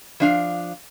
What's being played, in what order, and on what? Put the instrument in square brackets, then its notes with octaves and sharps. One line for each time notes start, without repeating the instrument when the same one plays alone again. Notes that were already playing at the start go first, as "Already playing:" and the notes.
[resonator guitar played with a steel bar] F3 D4 F5